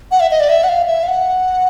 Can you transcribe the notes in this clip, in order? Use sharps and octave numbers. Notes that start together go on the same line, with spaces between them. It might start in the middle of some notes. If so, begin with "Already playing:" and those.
F#5
E5
D#5
D5
E5
F#5
F5
E5
F5
F#5